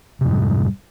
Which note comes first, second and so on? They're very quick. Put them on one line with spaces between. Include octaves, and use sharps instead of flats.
C3 F2 G#2 G3